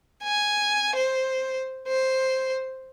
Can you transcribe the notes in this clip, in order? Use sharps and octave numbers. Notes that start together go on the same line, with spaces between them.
G#5
C5
C5